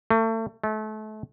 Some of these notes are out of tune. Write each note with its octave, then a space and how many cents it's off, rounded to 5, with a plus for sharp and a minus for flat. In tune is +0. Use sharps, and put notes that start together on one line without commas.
A3 +35
A3 -30